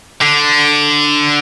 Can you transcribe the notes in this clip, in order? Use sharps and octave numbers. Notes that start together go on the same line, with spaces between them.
D3